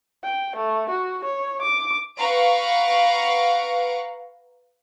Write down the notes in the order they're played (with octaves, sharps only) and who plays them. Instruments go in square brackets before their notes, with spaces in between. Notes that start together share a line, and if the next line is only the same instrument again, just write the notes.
[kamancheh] G5
A3
F#4
C#5
D6
[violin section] B4 F5 F#5 A#5 C#6 D7